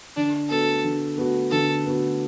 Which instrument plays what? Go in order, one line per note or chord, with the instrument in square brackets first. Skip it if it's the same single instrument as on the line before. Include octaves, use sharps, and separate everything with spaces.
[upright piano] D3 [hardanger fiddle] D4
[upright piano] B3 F#4 [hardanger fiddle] A4
[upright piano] D3
B3 F#4
[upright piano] D3 [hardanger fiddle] A4
[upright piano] B3 F#4